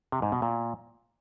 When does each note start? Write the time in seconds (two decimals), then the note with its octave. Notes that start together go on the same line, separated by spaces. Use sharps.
0.12 C3
0.22 G#2
0.32 B2
0.42 A#2